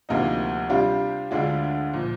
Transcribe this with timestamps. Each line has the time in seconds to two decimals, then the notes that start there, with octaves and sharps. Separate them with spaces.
0.09 D2 C3 F3 A#3 D#4
0.69 C3 G3 D4 F4
1.31 D2 D3 G#3 D4 F4
1.93 A#2 F3